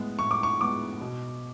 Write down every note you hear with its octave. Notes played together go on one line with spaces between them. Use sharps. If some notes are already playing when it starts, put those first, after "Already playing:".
Already playing: A2 G#3 B3
A2 C#6
D6
C#6
G#3 B3 D6
B2